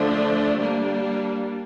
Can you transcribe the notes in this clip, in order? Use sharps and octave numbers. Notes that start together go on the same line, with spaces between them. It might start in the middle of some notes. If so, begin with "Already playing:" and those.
Already playing: D3 F3 A3 D4
G3 A#3 D4